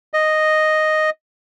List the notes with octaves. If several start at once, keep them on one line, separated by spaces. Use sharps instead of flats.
D#5